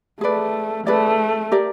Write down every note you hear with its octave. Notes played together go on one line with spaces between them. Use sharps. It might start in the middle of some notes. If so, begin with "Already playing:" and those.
A3 G#4 B4 D5
A3 G#4 B4 D5
G4 A#4 D5